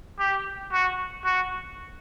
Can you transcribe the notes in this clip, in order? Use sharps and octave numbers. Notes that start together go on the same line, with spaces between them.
G4
F#4
F#4